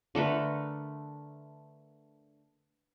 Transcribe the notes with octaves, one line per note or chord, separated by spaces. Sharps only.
D3 A3 A#4 B4